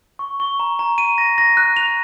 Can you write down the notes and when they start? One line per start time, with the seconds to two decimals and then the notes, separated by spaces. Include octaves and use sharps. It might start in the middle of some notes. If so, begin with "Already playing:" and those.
0.19 C#6
0.40 C#6
0.60 A#5
0.79 A#5
0.98 D#7
1.18 A#6
1.38 A#6
1.57 F#6
1.76 F7